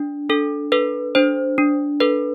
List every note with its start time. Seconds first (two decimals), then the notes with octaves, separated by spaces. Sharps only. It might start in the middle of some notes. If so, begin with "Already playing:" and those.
Already playing: D4
0.29 D4 A4
0.72 A4 B4
1.15 D4 C5
1.58 D4
2.00 A4 B4